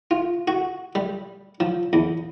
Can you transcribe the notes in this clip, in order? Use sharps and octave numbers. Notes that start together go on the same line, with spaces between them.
F4
F#4
G3
F3
E2